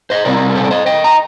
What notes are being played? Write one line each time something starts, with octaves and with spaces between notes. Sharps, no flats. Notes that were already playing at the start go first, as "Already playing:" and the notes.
C5 D#5
C3 G3 C4 A#4 D5
A#4
A4 C5
D5
C5 D#5
D#5 G5
A#5